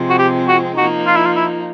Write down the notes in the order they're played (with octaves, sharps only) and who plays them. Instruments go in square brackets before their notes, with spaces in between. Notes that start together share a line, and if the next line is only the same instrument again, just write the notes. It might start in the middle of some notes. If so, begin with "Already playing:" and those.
Already playing: [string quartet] C3 F3 G#3 C4
[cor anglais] F#4
G4
F#4
[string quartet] F3 A#3 D#4 [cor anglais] F#4
[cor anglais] F4
E4
F4
E4